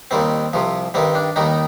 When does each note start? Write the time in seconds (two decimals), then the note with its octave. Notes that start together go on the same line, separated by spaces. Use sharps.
0.11 D#2 D#3 G3 C4
0.53 C2 C3 F3
0.94 G2 D#3 G3 C4
1.15 D4
1.36 D#2 D#3 G3 D#4